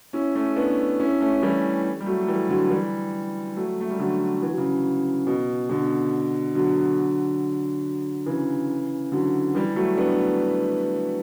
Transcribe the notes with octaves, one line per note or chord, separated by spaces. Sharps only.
C#4 E4
A3 C#4
B3 D4
C#4 E4
A3 C#4
E3 G3
G3
F#3 A3
A3
E3 G3
D3 F#3
E3 G3
F#3 A3
A3
G3
D3 F#3
E3
F#3
C#3 E3
B2
B2 D3
D3 F#3
C#3 E3
D3 F#3
E3 G3
F#3 A3
B3 D4